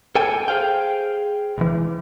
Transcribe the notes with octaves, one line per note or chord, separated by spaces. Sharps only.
A4 G5 G#5
G#4 C5 F5 G5
C2 E3